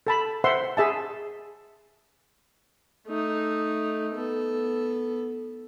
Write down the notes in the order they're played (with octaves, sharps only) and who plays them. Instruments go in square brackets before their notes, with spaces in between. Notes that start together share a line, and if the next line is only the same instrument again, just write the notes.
[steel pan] A4 A5 B5
C5 E5 F#5 C6
G#4 E5 A5
[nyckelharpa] A3 D#4
B3 A4